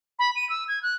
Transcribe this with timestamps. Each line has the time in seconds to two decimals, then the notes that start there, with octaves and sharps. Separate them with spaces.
0.19 B5
0.36 D#7
0.50 E6
0.68 G#6
0.83 F#6